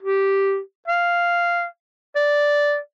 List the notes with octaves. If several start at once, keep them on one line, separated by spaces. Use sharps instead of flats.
G4
F5
D5